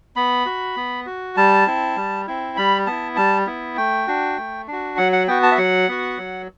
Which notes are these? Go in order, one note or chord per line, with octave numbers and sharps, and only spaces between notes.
B3 B5
F#4
B3
F#4
G3 A5
C4 E4
G3
C4 E4
G3 B5
B3 E4 A5
G3 A5
B3 E4
A3 G5
D4 F#4
A3
D4 F#4
F#3 F#5
F#5
B3 F#4 G5
A5
E5
F#3 F#5
B3 F#4
F#3